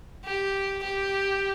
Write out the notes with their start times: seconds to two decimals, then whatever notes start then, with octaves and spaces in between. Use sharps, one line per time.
0.25 G4
0.83 G4